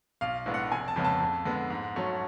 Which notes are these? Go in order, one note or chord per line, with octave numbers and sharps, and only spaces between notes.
B1 F5
A2 G#3 B3 D4
F#5
F1 G#5
A5
F2 C#3 G#3 B3
A5
F2
D3 G#3 B3
G#2
F#3 A3 C#4